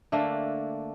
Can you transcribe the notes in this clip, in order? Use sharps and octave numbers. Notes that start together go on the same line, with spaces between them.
D3 A3 A#3 D4